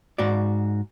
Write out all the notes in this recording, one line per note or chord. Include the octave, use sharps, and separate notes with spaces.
G#2 F#4 D5